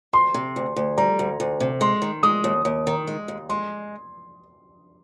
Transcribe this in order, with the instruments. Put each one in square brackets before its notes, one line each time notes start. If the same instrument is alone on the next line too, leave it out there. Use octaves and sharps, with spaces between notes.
[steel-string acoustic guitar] D2 [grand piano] C6
[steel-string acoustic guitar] C3
D2
D2
[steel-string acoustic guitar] G3 [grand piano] A#5
[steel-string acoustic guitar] D2
D2
C3
[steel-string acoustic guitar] G#3 [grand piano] C6
[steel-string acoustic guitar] D#3
[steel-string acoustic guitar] G#3 [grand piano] D#6
[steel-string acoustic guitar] D#2
D#2
D#3
G#3
D#2
[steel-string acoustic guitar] G#3 [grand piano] C6